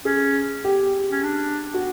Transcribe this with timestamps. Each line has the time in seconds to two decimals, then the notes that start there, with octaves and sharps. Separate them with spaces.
0.05 C#4 G#4
0.64 G4
1.11 C#4
1.23 D4
1.74 F#4